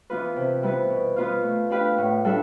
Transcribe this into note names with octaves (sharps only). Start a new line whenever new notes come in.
E3 B3 F4 B4
C3
G3 B3 E4 B4
B2
B3 F4 B4 F5
A3
D4 G4 B4 F5
A2
G3 D4 A4 E5